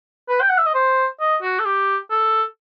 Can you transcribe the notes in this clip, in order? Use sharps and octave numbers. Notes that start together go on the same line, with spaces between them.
B4
G5
F#5
E5
D#5
C5
D#5
F#4
A4
G4
A4